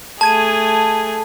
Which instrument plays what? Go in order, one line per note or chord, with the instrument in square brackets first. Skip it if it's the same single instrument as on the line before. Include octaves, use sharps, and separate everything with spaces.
[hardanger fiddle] A3 G#4 [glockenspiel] A5 G#6 D#7